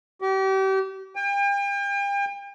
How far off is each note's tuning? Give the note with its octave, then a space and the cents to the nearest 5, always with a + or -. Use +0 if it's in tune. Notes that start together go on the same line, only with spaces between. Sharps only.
G4 -35
G5 +40